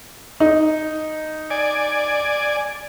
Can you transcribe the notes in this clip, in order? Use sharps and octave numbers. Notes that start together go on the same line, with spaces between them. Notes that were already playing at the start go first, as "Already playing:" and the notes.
D#4
D5 G#5